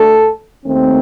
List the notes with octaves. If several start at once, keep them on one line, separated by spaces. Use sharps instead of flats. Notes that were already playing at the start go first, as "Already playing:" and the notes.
Already playing: D2 D3 A3 A4
D#2 D#3 A3 C4